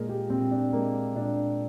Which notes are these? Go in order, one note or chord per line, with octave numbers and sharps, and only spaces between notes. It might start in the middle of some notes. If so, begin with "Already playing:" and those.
Already playing: A#2 G#3 G#4 A#4
G4
A#2 C4
D4
G#3 A#3
A#2 D4